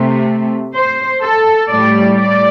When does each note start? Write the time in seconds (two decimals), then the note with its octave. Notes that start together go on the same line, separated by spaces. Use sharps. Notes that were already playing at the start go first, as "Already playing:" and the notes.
Already playing: C3 A3
0.75 C5
1.22 A4
1.70 A2 G3 D5
2.17 D5